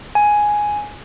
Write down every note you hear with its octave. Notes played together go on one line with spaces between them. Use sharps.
G#5